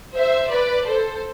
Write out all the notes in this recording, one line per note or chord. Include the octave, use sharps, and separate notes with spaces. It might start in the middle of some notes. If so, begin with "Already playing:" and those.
C5 E5
B4 D5
A4 C5